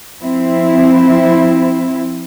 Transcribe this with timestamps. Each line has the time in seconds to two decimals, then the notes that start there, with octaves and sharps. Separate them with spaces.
0.21 F3 C4 E4